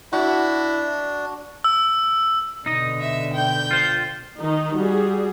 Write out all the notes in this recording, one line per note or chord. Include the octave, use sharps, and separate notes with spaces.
D4 E4 F#4
E6
B2 D3 D#4 D#5
E5
G5 G6
F4 C5
D#3 D#4
G3 F#4 G#4